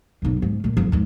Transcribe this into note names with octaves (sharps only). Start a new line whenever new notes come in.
B1 F#2
G#2
A#2
F#1 F2
F2 G#2